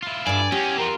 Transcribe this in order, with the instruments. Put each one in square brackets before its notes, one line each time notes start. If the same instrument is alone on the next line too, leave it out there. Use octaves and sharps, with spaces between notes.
[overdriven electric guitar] E4 F4
[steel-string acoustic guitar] G2 D3 [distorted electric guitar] D5 [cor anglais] G#5
[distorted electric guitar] E2 [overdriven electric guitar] C#4 [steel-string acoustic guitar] G4
[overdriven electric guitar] C4 F4 [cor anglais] A#4